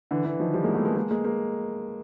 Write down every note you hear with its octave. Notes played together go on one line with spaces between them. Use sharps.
D3 E3
D3 E3
D#3 F3
F3 G3
G#3 A#3
A3 B3
G#3 A#3
G#3 A#3
G#3 A#3
G#3 A#3